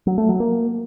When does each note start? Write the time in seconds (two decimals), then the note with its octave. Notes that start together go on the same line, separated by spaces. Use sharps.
0.07 F#3
0.18 A3
0.29 F#3
0.40 A#3